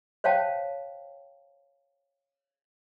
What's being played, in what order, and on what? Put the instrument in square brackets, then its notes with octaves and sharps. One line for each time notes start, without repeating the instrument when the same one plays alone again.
[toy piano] C5 C#5 F5 G5 A5